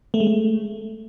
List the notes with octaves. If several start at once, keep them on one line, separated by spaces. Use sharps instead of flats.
A3
G#3
A3